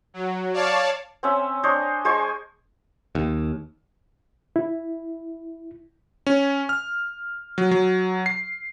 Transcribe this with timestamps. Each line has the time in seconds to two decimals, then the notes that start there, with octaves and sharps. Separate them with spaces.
0.14 F#3
0.53 C#5 D5 F5 A5
1.23 C4 C#4 E5
1.63 D4 C5 C#5 D#5
2.05 G#3 C5 G#5 C#6
3.15 D#2
4.56 E4
6.27 C#4
6.69 F6
7.58 F#3
7.71 F#3
8.26 C7